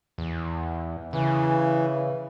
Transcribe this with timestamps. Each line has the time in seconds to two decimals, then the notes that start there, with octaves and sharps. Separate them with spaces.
0.18 E2
1.13 C#3 E3